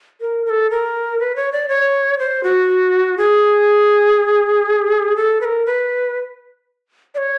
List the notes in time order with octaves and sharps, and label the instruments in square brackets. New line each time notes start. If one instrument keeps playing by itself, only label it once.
[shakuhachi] A#4
A#4
A4
A#4
B4
C#5
D5
C#5
C5
F#4
G#4
A4
B4
A#4
B4
D5
C#5